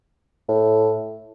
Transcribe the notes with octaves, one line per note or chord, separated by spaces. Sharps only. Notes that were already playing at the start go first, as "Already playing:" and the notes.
A2